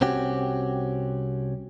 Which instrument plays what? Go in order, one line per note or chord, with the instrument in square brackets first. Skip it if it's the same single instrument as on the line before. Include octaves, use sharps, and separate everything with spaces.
[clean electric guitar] C2 C4 C#4 F#4 G4